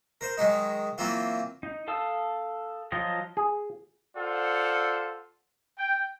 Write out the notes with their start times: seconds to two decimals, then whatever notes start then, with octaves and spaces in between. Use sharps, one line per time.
0.21 A#4 C5
0.37 D#3 F#3 G#3 D#4
0.98 E3 F#3 A#3 C4 F4
1.63 D#4
1.88 A4 F5 A5 D#6 E6
2.92 F3 F#3 F4 D#5
3.37 G#4
4.16 F4 A4 C5 D5 F#5
5.77 G5